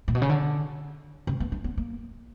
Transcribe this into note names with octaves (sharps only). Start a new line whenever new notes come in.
A#2
B2
C#3
D3
C#3
B3
D4
B3
A#3